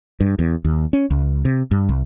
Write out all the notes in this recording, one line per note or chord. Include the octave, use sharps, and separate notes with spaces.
G2
E2
D#2
C#4
C#2
C3
G2
C2